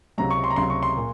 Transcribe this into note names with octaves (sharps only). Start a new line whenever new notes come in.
C#2 C3 F#3 A#5
C#6
C6
A#5
C#2 C3 F#3 C6
C#6
C6
A#2